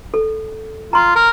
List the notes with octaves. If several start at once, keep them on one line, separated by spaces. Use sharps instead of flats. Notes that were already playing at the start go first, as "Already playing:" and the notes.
A4
F4 A#5 C6
A#4